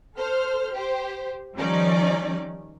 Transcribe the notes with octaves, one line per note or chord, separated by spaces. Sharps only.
A4 C5 F6
G4 C5
D#3 F3 G3 C#4 D#4 D5